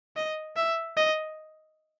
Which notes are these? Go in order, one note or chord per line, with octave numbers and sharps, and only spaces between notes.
D#5
E5
D#5